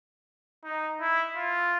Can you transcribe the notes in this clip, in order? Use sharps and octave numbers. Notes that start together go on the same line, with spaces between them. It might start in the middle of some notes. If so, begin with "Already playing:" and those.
D#4
E4
F4